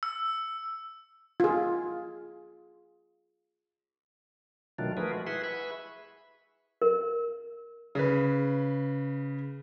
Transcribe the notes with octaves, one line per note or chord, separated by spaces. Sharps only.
E6
F4 G#4
B2 D#3 F#3 A3 D4 F4
F3 A3 G#4 A#4 B4
G#3 F#4
E4 G#4 B4 E5 F#5 C6
G#4 B4 E5 B5 C#6
A#4
C#3 B4